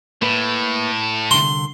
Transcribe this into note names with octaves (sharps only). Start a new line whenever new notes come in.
A2 A#3 B4
C2 D3 C6